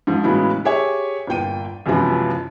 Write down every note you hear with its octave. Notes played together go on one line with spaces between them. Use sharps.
G#2 F3
A2 C#3 E3 F#3 G#3 B3
G4 G#4 C#5 E5 G#5
G1 A#2 G5 D#7
C#2 F#2 C3 E3 F3 B3